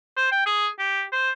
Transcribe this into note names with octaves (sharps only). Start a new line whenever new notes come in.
C5
G5
G#4
G4
C5